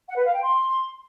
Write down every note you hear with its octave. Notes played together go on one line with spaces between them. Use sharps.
F#5
B4
F5
G5
C6